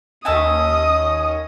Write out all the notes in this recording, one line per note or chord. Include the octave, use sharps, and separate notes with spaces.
D#2 C#4 D#5 E5 A5 D#6 E6